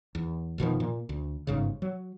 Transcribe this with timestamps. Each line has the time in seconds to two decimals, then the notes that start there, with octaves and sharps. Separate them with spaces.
0.15 E2
0.58 F1 B2 D#3 F3
0.80 A#2
1.09 D2
1.47 G1 G#2 C#3
1.82 F#3